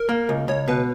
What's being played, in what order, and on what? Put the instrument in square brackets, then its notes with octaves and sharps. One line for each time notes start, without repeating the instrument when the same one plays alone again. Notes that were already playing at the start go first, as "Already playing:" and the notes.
Already playing: [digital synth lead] A#4
[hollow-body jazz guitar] A#3
C#2
[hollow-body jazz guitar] C#2 [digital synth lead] C#5
[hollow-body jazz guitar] B2 [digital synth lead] B4